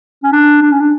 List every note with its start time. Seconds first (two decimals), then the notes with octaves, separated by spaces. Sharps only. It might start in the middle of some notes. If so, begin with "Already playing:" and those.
0.24 C#4
0.32 D4
0.62 D4
0.71 C#4
0.80 D4